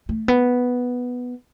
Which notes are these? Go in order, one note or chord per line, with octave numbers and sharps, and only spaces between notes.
A3
B3